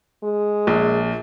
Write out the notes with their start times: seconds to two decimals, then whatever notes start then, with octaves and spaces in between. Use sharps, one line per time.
0.24 G#3
0.67 A#1